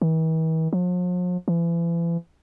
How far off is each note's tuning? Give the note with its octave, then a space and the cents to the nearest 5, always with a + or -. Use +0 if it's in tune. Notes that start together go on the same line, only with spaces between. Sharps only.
E3 -45
F3 +45
E3 +40